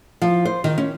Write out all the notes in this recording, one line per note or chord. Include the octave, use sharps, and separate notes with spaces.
F3
C5
D#3
C#4